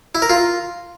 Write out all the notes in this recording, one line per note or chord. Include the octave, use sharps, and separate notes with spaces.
E4
A#4
F4